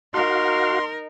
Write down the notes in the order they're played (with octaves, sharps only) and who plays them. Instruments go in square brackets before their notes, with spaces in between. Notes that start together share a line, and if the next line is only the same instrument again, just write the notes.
[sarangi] D#4 [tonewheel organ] F#4 F5 [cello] A#4 [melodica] C6